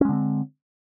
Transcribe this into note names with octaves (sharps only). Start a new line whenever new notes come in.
D3 G#3 C4 C#4